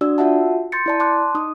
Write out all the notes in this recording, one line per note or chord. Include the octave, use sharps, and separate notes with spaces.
D4 F#4 D5 E6
F4 F#4 E5 F#5 A5
C6 G6 A6 C#7
E4 D5 A5
A5 C6 D6 F#6
D#4 D#6